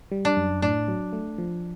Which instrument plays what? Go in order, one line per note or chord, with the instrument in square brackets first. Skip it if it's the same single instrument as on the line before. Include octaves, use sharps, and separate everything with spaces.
[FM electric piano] G3
[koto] D4
[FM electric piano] F#2
[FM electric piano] A2 [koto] D4
[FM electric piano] F#3
A3
F3